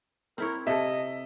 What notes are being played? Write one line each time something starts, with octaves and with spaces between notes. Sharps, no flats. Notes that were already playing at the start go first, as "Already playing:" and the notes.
C4 E4 A#4 C#5
C3 A4 D#5 E5